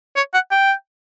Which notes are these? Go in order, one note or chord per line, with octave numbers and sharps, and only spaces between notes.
C#5
F#5
G5